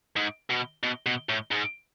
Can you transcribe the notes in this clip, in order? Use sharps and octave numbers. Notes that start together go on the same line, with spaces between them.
G#2
B2
B2
B2
A2
G#2